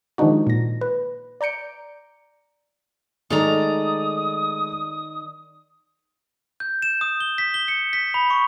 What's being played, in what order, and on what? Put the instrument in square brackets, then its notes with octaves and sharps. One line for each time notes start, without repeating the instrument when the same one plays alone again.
[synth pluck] D#3 F3 G#3 D4 D#4 F#4
A#2 A#6
B4
D5 A#5 G6 C#7 D7
[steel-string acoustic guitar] D#3 D5 A#5 [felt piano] G#3 A3 [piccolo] D#6
[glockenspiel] G6
E7
D#6
G7
B6
G7
C#7
B6
B5
C#6